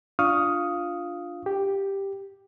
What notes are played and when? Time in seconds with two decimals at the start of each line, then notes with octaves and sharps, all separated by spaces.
0.19 D4 F4 F5 C#6 D#6 F6
1.46 G4